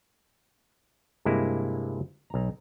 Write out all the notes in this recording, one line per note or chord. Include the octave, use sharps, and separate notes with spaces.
G2 C3 G#3 A#3 E4
B1 A#5